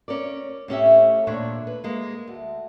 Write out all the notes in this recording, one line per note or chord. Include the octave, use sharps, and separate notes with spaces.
C#4 A#4 D5
A2 C#4 G4 E5
D#2 A#2 A3 D4 C5 C#5
B4
G#3 A#3
D2